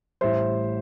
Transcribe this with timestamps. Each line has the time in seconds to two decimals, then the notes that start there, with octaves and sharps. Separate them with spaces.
0.21 A1 A2 G3 C5 E5